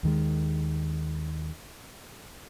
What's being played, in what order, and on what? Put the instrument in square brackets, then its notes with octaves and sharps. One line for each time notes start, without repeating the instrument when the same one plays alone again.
[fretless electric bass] D#2 D#3 G#3